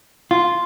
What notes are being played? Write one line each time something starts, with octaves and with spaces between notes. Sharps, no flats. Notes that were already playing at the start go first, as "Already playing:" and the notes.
F4